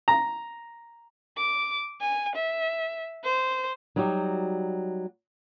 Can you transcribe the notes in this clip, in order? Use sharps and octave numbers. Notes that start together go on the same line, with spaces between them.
A#5
D6
G#5
E5
C5
F#3 G3 D#4 F#4 G4